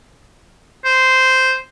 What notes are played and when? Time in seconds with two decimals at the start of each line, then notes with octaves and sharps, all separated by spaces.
0.85 C5